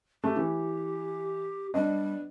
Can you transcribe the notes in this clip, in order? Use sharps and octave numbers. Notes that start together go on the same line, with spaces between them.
A3 G4
E3
G3 B3 D4 D#5